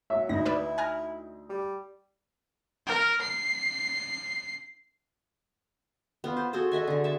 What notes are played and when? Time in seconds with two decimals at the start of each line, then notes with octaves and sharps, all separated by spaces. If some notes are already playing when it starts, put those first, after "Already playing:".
0.10 F#3 E5
0.29 D2 D#4 E4 A#6
0.46 B4 D5 E5
0.78 G#5 A#5 F6
1.49 G3
2.87 A#4
3.21 C7
6.24 B3 F4
6.37 C5
6.53 F#4 G#4 A4 C5
6.72 A4 D#5 E5 G#5
6.87 D3 G#4
7.04 E5 A5